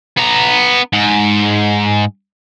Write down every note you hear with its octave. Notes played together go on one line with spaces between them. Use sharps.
B3 A#5
G#2